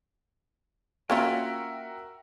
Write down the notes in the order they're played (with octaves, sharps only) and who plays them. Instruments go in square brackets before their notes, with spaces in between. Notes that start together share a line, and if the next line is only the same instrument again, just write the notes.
[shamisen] A#3 C#4 F4 [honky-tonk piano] F#4 A#4 E5 [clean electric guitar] G5